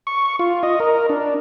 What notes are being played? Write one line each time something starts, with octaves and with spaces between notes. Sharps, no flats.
C#6
F4
D#5
A#4
D4